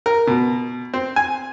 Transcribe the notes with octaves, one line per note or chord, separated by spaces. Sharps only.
A#4
B2
C4
G#5